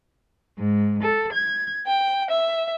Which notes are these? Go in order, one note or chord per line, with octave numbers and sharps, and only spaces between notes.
G#2
A4
G#6
G5
E5